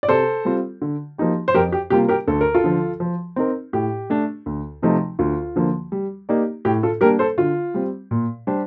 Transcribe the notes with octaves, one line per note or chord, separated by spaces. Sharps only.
D5
C3 A4 C5
G3 C4 F4
D3
F3 A#3 D#4 G4
C5
F2 G4 A#4
G4
C3 G3 A#3 F4 G4
G4 A#4
D2 A4
A#4
F4 A4
D3 F3
F3
C4 D#4 A#4
A2 G4
A3 D4
D2
C3 F3 A3 D#4
D2 F4
D3 F3 A#3
G3
A#3 D#4 G4 D5
A2 G4
F4 A4
G3 A#3 D4 G4 A#4
A4 C5
D3 F4
G3 C4
A#2
G3 D4 G4 C5